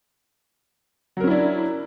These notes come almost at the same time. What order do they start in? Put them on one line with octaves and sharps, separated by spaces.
F#3 A#4 C#4 E4 D4